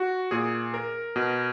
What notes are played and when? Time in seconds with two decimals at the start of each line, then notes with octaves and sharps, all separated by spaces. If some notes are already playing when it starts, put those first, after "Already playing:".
Already playing: F#4
0.31 A#2 G#4
0.74 A#4
1.16 B2